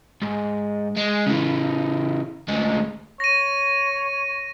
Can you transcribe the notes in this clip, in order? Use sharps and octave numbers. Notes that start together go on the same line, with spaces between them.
G#2
G#3
C#3 E3
D2 G#3
C#5 A#6 D#7